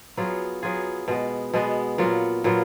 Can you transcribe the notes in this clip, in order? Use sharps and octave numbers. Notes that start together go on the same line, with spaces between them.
F#3 B3 F4 G#4
F#3 B3 F4 G#4
B2 G#3 B3
B2 G#3 B3
A#2 F#3 B3 F4
A#2 F#3 B3 F4